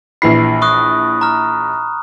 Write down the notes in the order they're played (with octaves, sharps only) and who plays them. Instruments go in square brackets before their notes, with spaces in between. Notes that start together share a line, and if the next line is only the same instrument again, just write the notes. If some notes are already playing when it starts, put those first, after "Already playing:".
[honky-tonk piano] A#1 E3 C7 [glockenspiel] B5
[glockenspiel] C#6 D#6 F#6
A#5 F6